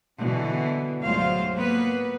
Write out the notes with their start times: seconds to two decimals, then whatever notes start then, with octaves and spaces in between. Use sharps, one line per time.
0.18 B2 D3 E3
1.02 D2 G#2 F#3 F4 C5 F5
1.57 A#3 B3 B4